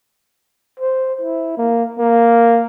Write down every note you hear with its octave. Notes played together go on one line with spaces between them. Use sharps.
C5
E4
A#3
A#3